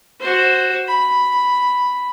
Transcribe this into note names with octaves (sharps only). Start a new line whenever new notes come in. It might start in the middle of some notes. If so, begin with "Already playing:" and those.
F#4 C5
B5